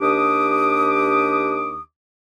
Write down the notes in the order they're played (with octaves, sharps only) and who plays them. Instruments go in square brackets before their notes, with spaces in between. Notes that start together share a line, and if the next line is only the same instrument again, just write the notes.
[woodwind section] D#2 D4 G4 D6 D#6